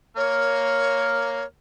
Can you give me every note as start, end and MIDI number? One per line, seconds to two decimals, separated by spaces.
0.16 1.42 58
0.16 1.44 73
0.16 1.42 89